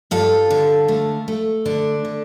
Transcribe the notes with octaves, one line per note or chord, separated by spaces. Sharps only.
G2 F4 A4
D3
A3
A3
D3 D4
D3